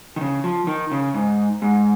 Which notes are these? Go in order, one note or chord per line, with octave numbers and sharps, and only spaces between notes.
D#3
C#3
F3
D#3
C#3
G#2
G#2